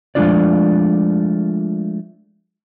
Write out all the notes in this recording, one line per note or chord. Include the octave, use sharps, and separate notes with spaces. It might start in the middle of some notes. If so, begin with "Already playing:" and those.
F3 G#3 A3 D4 F4 D5